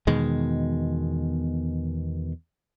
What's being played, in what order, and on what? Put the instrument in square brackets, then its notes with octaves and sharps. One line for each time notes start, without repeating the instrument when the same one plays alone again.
[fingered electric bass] E2 B2 D#3 G#3